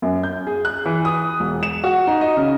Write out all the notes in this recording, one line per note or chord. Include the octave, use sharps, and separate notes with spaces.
F#2
G6
G#4
F#6
E3
D#6
E1
E7
F#4
D#4
D#5
C#3